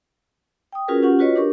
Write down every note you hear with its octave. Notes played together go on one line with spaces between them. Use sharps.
G5 D#6
C#4 F4 F#4 G#4 A#4 B4
C#4 F4 G4 F#5 C#6
F4 F#4 B4 C#5 D#5
D4 G4 A#4 C#6